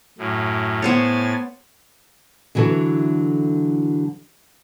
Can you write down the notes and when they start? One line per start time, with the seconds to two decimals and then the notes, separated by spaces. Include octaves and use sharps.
0.18 F#2 A2
0.82 A2 B3 C5 C#5 G#5 A6
2.55 D3 E3 F#3 E4 A4